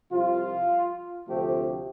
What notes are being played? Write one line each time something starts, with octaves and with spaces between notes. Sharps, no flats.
C2 C3 F3 F4
D2 C3 F3 A3 G4